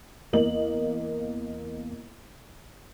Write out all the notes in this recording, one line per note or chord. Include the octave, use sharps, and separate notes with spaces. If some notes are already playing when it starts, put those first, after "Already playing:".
E2 A#3 D#5 F#7